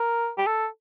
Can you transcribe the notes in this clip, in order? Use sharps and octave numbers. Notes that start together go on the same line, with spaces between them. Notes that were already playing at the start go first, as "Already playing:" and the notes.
Already playing: A#4
G4
A4